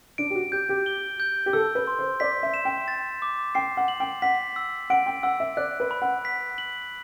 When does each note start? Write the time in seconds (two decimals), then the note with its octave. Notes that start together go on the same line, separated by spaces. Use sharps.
0.18 D4 D7
0.30 G4
0.35 F#4
0.52 G4 G6
0.69 G4
0.86 G7
1.20 G6
1.46 G4
1.53 A4 E6
1.75 B4
1.87 C6
1.98 C5
2.20 D5 B6
2.43 E5
2.54 E7
2.65 G5
2.88 A6
3.22 D6
3.55 G5 C7
3.77 F#5
3.88 F#7
4.00 G5
4.22 F#5 B6
4.56 E6
4.90 F#5 D7
5.06 G5
5.23 F#5 E6
5.40 E5
5.57 D5 F#6
5.80 B4
5.91 B5
6.02 F#5
6.25 B6
6.58 F#7